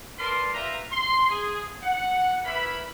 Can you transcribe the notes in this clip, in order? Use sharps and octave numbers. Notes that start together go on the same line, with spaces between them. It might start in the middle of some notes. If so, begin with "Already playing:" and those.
A#4 B4 D5 A5 C6
F4 G4 B4 E5 A#5
C6
G#4
F#5
E3 A#4 E5 B5